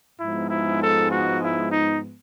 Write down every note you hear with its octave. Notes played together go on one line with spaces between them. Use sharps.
G#2 F3 G#3 B3 E4
E4
A4
F#4
E4
D#4